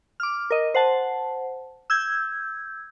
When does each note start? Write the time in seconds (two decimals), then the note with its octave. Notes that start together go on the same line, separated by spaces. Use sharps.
0.20 D6 F6
0.50 A#4 D#5
0.74 C5 F#5 A5
1.90 E6 G6 G#6